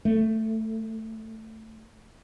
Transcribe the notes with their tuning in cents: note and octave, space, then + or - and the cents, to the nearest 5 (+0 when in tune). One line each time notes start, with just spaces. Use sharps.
A3 +10